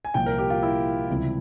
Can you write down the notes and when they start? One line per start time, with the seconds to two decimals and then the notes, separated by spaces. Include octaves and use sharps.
0.05 G#5
0.14 C2 A#2 F3 G5
0.26 A#4
0.38 G4
0.50 F4
0.63 E4
1.09 C#2 C3 E3 G3